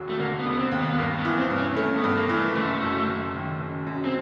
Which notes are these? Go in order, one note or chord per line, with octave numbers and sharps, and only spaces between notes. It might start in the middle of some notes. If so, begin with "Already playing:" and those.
Already playing: E1 D#2 F#3
A3
D3 A#3
B3
E1
B3
C4
D#2
B3
B3
G2 A#3
B3
E3
C4
G2
C#4
A3 C#4
B3
G2
A#3
E3
A3
F#1 A3
F#2
F#1
D#3
F#1
F#2
C4